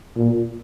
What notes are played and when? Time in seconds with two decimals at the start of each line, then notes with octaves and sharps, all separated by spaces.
0.16 A#2